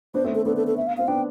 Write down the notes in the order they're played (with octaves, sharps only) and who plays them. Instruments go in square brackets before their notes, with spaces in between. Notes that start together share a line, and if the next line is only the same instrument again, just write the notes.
[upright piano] B3 D4 [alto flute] C5
[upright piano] A3 C4
[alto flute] A4
[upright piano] B3 D4 [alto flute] A4
[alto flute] A4
A4
E5
F5
[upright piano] C4 [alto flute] F5
[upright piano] B3 D4 [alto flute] G5